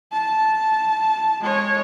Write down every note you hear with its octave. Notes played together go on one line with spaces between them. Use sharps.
A5
G#3 C#5